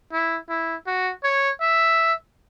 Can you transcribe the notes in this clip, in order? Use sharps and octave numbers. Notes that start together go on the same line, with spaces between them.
E4
E4
F#4
C#5
E5